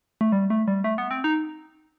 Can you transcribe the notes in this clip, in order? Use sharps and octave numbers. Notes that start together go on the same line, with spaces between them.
A3
G3
A3
G3
A3
B3
C4
D#4